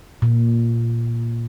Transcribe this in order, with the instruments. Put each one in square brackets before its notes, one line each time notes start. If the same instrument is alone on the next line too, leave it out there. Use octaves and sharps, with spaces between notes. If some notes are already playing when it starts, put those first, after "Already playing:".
[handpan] A#2